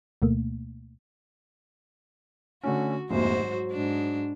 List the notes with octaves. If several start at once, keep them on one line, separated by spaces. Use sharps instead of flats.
D2 B2 A3 A#3
D3 A3 C#4 F#4
F1 A#1 D#2 G#2 F#4 C5
F#3
G#2 D4